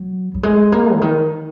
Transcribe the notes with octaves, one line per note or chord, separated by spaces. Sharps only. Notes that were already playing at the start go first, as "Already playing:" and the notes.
Already playing: F#3
F#3
G#3
A#3
D3
D#3